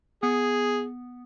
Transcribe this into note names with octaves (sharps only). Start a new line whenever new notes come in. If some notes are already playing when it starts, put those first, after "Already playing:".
B3 G#4